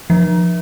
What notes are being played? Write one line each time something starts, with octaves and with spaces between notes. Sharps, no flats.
F3